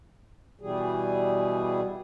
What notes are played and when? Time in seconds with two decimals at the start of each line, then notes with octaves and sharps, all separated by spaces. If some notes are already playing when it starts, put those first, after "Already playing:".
0.61 B2 E3 G3 G#4